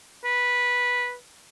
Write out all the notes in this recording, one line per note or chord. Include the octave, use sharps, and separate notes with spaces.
B4